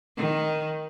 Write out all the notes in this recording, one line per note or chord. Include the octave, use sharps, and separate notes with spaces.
D#3